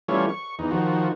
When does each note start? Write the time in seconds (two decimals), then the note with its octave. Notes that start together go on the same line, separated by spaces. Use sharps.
0.08 E3 G3 A3 C#4 F4 C#5
0.29 C#6
0.59 E2 D#4
0.71 D#3 F3 F#4